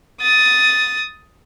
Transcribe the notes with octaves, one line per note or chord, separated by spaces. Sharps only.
D#6 A6